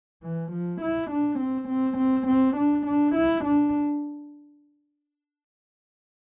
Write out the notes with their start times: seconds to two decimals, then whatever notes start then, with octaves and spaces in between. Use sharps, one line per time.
0.23 E3
0.52 F3
0.82 E4
1.11 D4
1.40 C4
1.69 C4
1.98 C4
2.28 C4
2.57 D4
2.86 D4
3.15 E4
3.45 D4